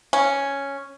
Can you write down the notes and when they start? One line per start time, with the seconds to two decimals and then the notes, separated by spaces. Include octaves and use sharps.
0.13 C#4